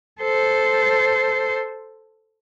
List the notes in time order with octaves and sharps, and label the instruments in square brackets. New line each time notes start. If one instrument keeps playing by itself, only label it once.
[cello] A4 C5